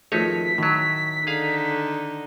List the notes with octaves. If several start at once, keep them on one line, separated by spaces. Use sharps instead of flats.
G#1 F3 A3 D#4 C#5 B6
A2 D#3 F#3
D3 D#4 G#4 F5